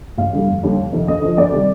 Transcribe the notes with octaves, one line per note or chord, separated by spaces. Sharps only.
A1 F5
G2 D3 G3
F1
D#2 D3 G3
F1
F2 C3 D#3
D2 D#5
D3 F3
D2 D5
C3 D#3 G3